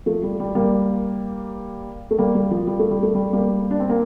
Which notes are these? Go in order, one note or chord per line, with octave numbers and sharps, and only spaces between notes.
F3 A3
G3
G3
G3 A#3
A3
G3 A#3
G3
F3
G3
A3
G3
A3
G3
G3 A#3
D4
C4
A#3